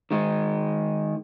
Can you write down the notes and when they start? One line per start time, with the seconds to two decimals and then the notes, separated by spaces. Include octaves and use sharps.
0.11 D#3 G#3